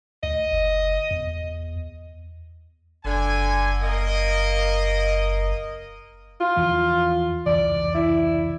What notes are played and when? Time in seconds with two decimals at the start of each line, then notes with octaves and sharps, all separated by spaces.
0.23 D2 D#5
0.51 F#1
1.11 E2
3.05 F#1 D3 G#5
3.82 A#3 D#5
6.41 F4
6.56 E2 E3 F3
7.46 F1 C#2 E3 D5
7.95 E4